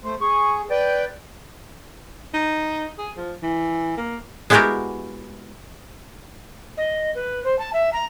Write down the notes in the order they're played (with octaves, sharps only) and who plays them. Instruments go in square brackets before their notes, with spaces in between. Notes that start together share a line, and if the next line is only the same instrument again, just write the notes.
[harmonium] A3 C5
[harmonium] G#4 [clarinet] C#6
[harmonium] B4 G5 [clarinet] D5
[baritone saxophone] D#4
G#4
F3
E3
A#3
[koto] G#3 B3 E4 F#4 G4 A#4
[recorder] D#5
B4
C5
A5
E5
A#5